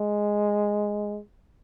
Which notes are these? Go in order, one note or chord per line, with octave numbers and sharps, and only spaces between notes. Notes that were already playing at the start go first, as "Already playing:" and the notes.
Already playing: G#3